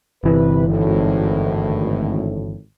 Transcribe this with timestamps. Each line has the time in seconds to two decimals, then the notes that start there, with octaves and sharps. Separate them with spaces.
0.24 G1 C3 E3 B4
0.68 G#1 D2 A2